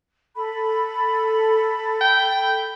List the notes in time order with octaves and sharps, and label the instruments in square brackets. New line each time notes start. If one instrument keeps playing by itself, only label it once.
[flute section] A4 B5
[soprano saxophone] G5